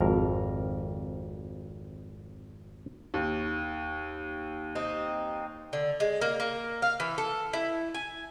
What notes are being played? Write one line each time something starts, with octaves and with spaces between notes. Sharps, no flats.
G#1 F2 A#4
D#2
C4 D#4 G4
D3
G#3
A#3
A#3
F5
E3
A4
E4
G#5